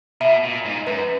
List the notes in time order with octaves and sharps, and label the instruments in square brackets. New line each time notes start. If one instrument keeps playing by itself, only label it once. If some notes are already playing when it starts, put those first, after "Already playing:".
[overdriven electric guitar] B2 [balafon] E5
[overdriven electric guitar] A#2
G#2
[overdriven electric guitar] F#2 [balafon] B4